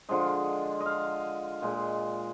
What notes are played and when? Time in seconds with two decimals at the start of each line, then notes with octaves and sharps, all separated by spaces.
0.09 D3 F3 G#3 D#5
0.80 D#5
0.86 F5
1.62 A#2 G#3